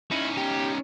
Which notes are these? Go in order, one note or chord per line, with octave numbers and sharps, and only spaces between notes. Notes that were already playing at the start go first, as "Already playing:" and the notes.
C#4 D#4 E4
G4